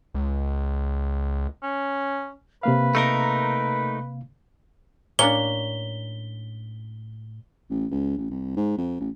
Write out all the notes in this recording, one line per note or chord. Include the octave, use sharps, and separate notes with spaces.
C#2
C#4
C3 A#3 B4 F5
A3 D#4 A#4
A2 A#3 C#4 D4 C#5 C#6 B6 G7
A1
C#2
A1
C2
G#2
F2
A1